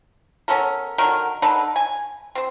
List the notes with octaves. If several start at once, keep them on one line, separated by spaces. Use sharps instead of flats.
B3 C#4 A4 A#4
D3 D#3 F#3 A#4
D3 D#4 A4 B4
G#5
C4 C5